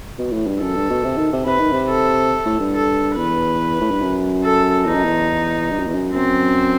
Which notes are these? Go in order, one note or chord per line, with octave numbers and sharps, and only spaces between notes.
B2
A2
G2
F#2 A4
G2
B2
C3
D#3
C3
C3 B4
D#3
C3
A4
A2
G2
A4
E2 B4
A2
G2
F#2
A4
E2 D#4
F#2
E2
G2
F#2
E2
F#2
F#2 C4